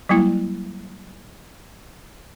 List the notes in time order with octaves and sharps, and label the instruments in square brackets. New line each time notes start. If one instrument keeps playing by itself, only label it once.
[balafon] F#3 G3 A#3 E4